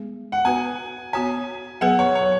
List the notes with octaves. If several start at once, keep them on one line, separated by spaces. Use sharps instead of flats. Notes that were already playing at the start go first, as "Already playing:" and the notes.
Already playing: G#3 B3 G#4
F#5
B3 F#4 B4 G#5
B3 F#4 C#5 G#5
F#3 B3 G#4 B4 F#5
C#5
C#5